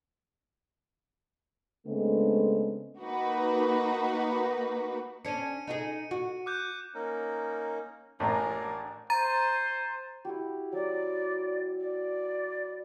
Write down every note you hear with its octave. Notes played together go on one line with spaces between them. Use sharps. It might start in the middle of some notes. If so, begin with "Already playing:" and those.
C#3 G#3 A3 B3 C4 D4
A#3 D#4 F#4 B4
C#4 D4 C#7 D#7
D#4 F4 G#4
F#4
D6 F#6 G6
A#3 C#4 D#4
A1 A2 D4 A#4 G#5
C5 A#5 A6 D#7
E4 F#4 G4
F#3 D5 A#5
D5